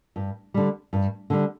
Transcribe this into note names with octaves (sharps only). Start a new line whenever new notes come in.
G2
D3 G3
G2
D3 G3